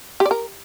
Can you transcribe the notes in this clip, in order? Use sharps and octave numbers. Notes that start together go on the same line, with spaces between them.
G4
D5
A#4